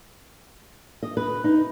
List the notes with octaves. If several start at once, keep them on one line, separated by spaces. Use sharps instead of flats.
D#5
B4
D#4